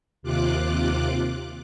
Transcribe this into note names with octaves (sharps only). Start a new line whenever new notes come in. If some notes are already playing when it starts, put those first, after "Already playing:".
D#2 C3 F4 D6 F#6